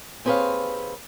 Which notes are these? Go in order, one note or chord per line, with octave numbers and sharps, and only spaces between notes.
D#2 C4 G#4 B4 C#5 F5